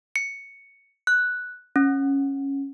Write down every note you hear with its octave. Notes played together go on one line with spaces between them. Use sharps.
C#7
F#6
C#4